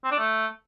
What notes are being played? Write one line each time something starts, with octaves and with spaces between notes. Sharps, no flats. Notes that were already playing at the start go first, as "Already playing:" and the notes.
C4
D4
A3